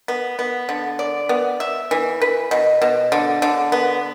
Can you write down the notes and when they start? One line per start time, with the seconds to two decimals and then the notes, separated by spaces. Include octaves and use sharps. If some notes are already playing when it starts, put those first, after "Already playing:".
0.08 B3
0.39 B3
0.69 D3
0.99 D5
1.29 B3
1.60 E5
1.91 E3
2.22 B4
2.51 B2
2.82 B2
3.12 D3
3.42 D3
3.72 B3